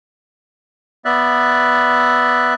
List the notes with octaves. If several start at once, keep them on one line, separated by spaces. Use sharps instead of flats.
B3 D5 E5 F#6